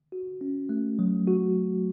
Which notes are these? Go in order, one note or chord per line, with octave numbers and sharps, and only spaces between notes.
F#4
C#4
A3
F#3
F#4